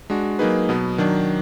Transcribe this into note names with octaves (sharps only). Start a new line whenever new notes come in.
G#3 D4 F#4
F#3 A#3 D#4 G#4 B4
B2 F#3 B3
D#3 F#3 D4